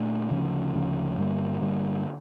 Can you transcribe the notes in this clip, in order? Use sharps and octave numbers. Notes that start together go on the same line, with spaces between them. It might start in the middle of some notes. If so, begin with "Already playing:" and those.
Already playing: A#2 A3 D4
D2 C#3 F3 C#4
D2 C#3 F3 C#4
G2 D3 G3 A#3
G2 D3 G3 A#3